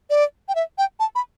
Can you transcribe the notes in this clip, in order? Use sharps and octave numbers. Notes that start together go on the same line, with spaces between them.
D5
G5
E5
G5
A5
B5